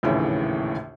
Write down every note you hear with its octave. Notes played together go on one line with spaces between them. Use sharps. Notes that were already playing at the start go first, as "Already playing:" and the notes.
A#1 D#2 A2 C#3 E3